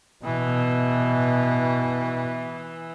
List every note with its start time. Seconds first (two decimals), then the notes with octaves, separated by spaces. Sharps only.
0.25 B2 E3